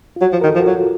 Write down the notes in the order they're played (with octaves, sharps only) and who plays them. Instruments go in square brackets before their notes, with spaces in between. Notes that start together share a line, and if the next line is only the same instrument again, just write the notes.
[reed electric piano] F4
[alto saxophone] F#3 [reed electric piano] F#4
[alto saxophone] F3
[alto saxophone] D#3 [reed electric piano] A#4
[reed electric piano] A4
[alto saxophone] F3
[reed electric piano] F#4
[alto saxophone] F#3 [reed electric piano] F4